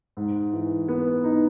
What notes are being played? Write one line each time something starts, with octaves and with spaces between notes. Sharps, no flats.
G#2
E3
B3
D#4